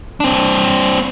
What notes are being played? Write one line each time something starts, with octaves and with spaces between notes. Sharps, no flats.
C4 D4